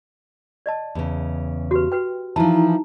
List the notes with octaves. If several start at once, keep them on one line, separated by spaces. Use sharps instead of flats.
D5 D#5 A5
E2 C#3
F#4 G4 B4
F#4 B4 G5
E3 F3 D#4 E4 A5 A#5